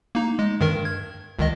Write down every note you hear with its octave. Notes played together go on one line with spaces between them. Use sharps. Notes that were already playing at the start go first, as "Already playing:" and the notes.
A#3 D#4
G#3
G2 D#3 A#4
G#6
C#2 D#3 D#5